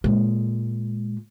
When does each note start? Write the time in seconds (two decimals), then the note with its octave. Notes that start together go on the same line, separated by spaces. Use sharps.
0.04 A#2 G#3